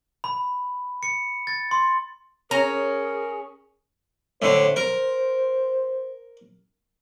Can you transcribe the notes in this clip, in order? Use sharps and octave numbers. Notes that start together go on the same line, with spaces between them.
B5
C#7
A6
C6
C#4 G#4 A#4 A#5
A2 D3 C5
A#4